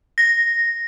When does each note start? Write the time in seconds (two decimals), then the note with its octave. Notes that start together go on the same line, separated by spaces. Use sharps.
0.18 A#6